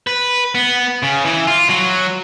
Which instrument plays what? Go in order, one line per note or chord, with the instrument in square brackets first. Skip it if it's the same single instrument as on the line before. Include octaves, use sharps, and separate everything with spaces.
[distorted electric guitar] B4
B3
C#3
E3
F4
F#3